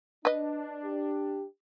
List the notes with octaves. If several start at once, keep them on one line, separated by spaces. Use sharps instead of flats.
D4 B4 D#5
G4